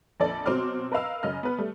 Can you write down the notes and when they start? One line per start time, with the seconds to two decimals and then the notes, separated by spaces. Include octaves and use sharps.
0.20 A#1 F2 A4 D5
0.46 B2 F#3 C4 C6 D6 F6
0.92 A#4 B4 D#5 F5 E6
1.23 F#2 C#3 D#5 F6
1.43 B3 B4
1.58 G3 A3